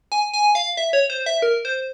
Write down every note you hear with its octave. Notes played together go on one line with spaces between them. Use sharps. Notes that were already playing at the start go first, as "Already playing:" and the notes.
G#5
G#5
F5
E5
C#5
C5
E5
A#4
C5